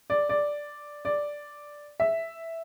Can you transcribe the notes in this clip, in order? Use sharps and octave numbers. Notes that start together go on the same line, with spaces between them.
D5
D5
D5
E5